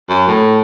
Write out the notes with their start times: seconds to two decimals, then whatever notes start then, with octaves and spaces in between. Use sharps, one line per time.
0.09 F#2
0.28 A2